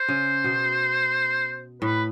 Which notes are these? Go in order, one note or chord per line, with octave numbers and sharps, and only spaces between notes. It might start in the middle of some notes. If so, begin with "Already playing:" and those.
Already playing: C5
C#3
B2
A2 B4